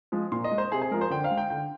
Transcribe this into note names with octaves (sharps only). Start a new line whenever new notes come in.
F3 G#3
A#2 C6
D#5
G#3
C5
C3 G#4
G#4
F3 G#3 A#4
C5
D3 G5
F5
G#3
G5
D3 G5